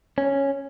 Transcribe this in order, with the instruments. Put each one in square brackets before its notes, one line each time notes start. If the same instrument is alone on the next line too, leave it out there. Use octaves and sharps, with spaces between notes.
[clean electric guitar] C#4